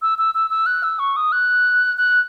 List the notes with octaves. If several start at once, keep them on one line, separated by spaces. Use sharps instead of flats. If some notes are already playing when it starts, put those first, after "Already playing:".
E6
E6
E6
E6
F#6
E6
C#6
D#6
F#6
F#6